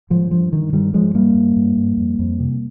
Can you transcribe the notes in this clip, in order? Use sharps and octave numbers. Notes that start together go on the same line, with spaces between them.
G#2 F3
G2 F3
G2 D#3
G2 D#3 G3
G2 F3 G#3
G2 G3 A#3
G2
G2
G2
F2
F2
C3